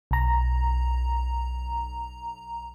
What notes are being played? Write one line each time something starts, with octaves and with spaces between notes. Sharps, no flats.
B1 A#5